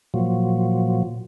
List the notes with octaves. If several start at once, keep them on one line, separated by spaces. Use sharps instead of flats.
A#2 F3 F#3